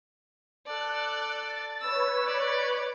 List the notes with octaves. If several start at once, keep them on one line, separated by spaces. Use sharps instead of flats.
A4 D5 F#6
A6
B4 C#5 E6
D5